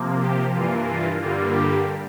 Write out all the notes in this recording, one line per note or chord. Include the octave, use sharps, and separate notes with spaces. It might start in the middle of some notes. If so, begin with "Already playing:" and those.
Already playing: C3 F3 A#3
G4
G2 E3 A#3 F4
F4
G2 D3 G3 A#3 F4
G4